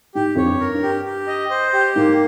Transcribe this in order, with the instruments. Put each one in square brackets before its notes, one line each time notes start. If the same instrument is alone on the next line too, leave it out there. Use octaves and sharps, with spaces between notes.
[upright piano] G#2 [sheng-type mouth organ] G4
[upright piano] F2 [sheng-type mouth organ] C#5
[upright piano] G2
[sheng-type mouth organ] A#4
[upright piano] G2
[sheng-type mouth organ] G4
G4
D#5
C5
G4
[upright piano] G#2 [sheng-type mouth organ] A#3